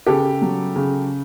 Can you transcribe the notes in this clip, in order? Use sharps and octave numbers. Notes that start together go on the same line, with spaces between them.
C#3 G4 A4
F#3
C#3